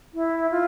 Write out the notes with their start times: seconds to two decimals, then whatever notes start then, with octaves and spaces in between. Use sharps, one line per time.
0.14 E4
0.51 F4